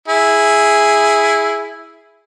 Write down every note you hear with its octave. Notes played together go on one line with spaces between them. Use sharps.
E4 G#4